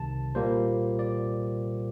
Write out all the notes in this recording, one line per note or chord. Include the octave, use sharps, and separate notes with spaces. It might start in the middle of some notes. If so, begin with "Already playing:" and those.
Already playing: C2 C3 D#3 A5
A#2 G3 A#3 C5
D5